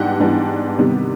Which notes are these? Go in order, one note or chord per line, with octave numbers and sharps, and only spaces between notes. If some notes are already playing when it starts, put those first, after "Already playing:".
Already playing: G#2 E3 G3 B3 D4 F#5 G5
G#2 E3 G3 B3 D4
C3 D#3 G3 B3